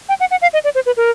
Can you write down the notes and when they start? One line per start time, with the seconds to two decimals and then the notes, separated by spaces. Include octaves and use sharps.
0.09 G5
0.20 F#5
0.31 F#5
0.42 F5
0.53 D#5
0.64 D5
0.75 C5
0.86 B4
0.97 A#4